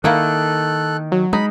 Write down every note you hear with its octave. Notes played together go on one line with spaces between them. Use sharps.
D#3 A#3 E4 A4 F#5 F#6
F#3
G#3 D#4 B5